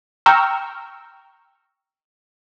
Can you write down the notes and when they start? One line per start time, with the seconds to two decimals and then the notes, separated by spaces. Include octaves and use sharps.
0.26 G5 A#5 C#6 E6 F6